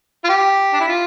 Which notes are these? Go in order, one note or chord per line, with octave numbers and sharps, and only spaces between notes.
F4
G4
D4
E4
F4